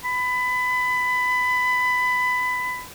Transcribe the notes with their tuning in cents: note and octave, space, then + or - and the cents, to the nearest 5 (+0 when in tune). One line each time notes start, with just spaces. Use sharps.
B5 +20